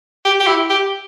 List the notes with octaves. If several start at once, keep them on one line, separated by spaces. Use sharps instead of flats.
G4
G4
E4
G4